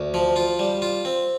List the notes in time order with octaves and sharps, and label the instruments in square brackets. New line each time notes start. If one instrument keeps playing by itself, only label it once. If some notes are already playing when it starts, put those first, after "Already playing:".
Already playing: [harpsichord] D2
F3
F4
G3
F4
C4